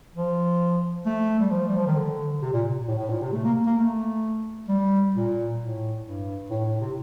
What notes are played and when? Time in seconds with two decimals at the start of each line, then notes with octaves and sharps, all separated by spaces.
0.15 F3
1.06 A3
1.40 G3
1.51 F3
1.68 G3
1.78 F3
1.87 D#3
1.96 D3
2.42 C3
2.53 A#2
2.88 A2
2.99 A2
3.10 A#2
3.22 C3
3.33 A3
3.44 A#3
3.66 A#3
3.78 A3
4.69 G3
5.15 A#2
5.60 A2
6.05 G2
6.50 A2
6.66 A2
6.81 C3